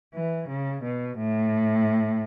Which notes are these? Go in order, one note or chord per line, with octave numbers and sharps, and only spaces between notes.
E3
C#3
B2
A2